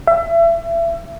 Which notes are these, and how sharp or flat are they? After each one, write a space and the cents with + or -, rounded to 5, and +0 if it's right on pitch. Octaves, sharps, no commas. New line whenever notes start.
E5 +30